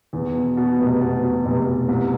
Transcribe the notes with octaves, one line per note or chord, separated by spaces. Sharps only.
E2
B2
B2
F1
B2
B2
F1
B2
C2